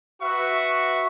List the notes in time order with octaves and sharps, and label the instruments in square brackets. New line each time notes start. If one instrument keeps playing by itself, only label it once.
[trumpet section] F#4 B4 E5 C#6